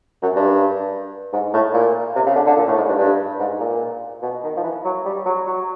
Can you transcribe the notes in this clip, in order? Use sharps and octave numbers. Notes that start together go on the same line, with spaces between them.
F#2
G2
G#2
A2
A#2
C3
C#3
D3
D3
A#2
A2
G#2
G2
G2
G#2
A#2
B2
D#3
F3
E3
F#3
G3
F#3
F#3